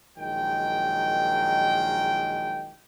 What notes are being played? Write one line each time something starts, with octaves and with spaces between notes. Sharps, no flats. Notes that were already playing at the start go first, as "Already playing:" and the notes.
A#1 D#3 F#3 G#3 G5